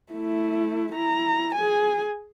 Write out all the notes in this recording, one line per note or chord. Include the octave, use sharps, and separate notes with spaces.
A3 E4
E4 A#5
G#4 G#5